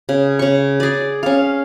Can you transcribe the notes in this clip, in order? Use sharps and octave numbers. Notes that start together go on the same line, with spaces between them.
C#3
C#3 C#6
G#4 D5
C#4 F5